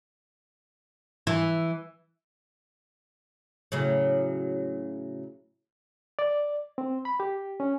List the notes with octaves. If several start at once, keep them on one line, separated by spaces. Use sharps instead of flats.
E3
A2 C#3 F#3
D5
C4
B5
G4
C#4